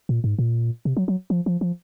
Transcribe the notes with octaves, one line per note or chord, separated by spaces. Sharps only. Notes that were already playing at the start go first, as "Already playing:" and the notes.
A#2
G#2
A#2
C3
F#3
F#3
F3
F3
F3